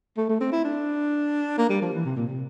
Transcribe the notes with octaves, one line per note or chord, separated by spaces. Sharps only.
A3
A3
C4
E4
D4
A#3
G3
F3
E3
C3
A#2
C3